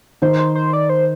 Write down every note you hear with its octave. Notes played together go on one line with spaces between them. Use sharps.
D#3 D#4 C5
C5
C5
D5
C5